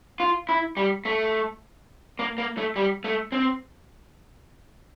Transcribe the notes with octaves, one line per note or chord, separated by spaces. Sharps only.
F4
E4
G3
A3
A#3
A#3
A3
G3
A3
C4